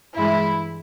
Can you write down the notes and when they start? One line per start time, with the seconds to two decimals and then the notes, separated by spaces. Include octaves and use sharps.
0.16 G2 E3 G#3 E4